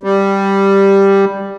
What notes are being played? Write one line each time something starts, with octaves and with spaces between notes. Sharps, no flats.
G3